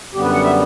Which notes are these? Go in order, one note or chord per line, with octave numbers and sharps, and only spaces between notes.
F#2 D3 G3 B3 G4
B4
F#5
E5